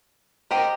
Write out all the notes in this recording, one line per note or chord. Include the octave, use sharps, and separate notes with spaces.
C4 G4 A#4 D#5